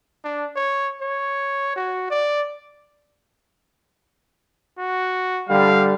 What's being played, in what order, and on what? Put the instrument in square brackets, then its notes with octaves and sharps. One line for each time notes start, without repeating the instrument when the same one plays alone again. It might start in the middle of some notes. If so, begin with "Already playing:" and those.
[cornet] D4
C#5
C#5
F#4
D5
[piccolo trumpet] F#4
[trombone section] D3 G3 [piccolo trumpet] F5